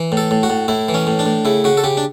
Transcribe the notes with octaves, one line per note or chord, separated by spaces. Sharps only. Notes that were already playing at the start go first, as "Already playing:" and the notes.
Already playing: E3
A2
A4
A2
F#4
A2
A2 E4
E3
C#4
A2
D4
A2
C#3 E4
C#3 F#4
A4
C#3 G4
D4